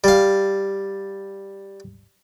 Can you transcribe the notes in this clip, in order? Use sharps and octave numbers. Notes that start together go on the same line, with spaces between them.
G3 F5